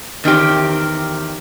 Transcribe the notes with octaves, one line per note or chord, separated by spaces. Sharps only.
E2 D#3 C4 G4